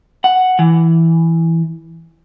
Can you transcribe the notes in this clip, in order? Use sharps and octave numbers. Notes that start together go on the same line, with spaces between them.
F#5
E3